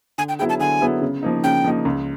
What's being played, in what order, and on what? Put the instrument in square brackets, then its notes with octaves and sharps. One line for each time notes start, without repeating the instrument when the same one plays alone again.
[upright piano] D3 [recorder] G#5
[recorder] G5
[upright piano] F#3 B3 E4 G#4 [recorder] G5
[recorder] A5
[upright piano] D3 [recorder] G#5
[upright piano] F#3 B3 E4 G#4
C#3
F3 A#3 D#4
[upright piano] C#3 [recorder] G5
[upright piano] F3 A#3 D#4
C#2